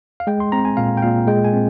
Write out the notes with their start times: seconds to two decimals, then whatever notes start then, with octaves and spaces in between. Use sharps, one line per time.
0.20 F5
0.27 G#3 G5
0.40 C6
0.52 C4 A#5
0.65 G#5
0.77 A#2 F5
0.97 G5
1.02 A#2 F5
1.27 G#3 G5
1.45 G#5
1.54 C4